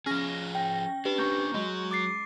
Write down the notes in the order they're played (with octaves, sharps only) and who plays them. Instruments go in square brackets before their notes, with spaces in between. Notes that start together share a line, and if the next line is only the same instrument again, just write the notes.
[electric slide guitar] F3 G#4 [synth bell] C#4 A#6
[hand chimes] G5
[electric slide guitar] D4 [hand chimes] G4 B4
[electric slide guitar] A#3 D4 [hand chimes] C#6 G6
[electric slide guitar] F#3 [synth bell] G#3
[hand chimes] D6 A6 C7